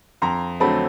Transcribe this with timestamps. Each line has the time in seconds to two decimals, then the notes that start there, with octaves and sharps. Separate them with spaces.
0.22 F2 A#5 C6
0.60 D3 F#3 A3 C4 A5 B5